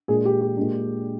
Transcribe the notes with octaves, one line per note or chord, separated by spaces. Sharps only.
A#2 G#3 D4 G#4
G4
G4
A#2 G#3 D4